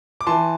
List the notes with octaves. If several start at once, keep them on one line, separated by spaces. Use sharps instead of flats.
D6
E3 A5 C6